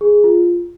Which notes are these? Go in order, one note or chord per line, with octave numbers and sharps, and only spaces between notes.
G#4
F4